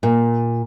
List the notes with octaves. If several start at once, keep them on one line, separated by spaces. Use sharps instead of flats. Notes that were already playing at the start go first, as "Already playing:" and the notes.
A#2